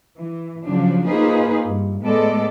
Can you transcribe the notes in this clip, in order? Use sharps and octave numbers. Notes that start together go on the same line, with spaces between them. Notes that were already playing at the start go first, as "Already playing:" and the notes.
E3
C#3 F3 F#3 D4
A#3 D#4 F4 G#4 B4 C5
G2
A2 G#3 B3 A4 D5